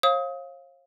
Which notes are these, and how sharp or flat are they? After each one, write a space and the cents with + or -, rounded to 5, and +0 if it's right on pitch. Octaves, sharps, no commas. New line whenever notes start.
C#5 -45 F5 +0 D#6 +30